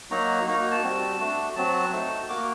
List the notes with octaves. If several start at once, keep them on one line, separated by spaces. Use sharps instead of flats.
F#3 A#3 D#4 F#4 A#5
A#3 D#4 F#4 A#5
A#5
A5
G3 C4 F#4
A3 D4 F#4
F#3 C4 F#4 A5
A3 D#4 F#4
A#3 F#4 D6